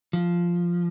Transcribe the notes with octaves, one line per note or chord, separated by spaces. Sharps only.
F3